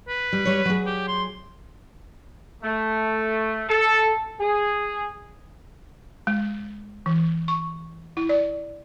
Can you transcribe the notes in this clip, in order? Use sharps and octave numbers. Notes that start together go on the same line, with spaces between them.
B4
G3
G3 C#5
F#3 G#4
G4
C6
A3
A4
G#4
G#3
E3
C#6
E4
D5